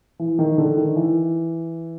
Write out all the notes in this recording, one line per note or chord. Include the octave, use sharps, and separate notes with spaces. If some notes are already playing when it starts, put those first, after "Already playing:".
E3
D#3
D3
D#3
E3